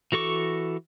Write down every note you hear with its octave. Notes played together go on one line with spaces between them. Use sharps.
E3 F#4 A4 C#6 D6